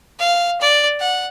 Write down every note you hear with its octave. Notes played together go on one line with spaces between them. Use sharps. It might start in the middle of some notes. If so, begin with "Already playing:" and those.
F5
D5
F#5